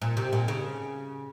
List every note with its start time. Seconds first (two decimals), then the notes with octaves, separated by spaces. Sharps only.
0.02 A#2
0.17 C3
0.33 A#2
0.48 C#3